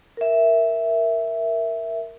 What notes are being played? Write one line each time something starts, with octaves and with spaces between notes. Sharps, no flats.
A#4 E5